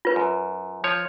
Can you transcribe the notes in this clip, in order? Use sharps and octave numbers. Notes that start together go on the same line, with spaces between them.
F4 B4
F#2
F3 C#5